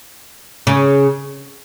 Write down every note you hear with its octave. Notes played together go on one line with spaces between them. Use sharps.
C#3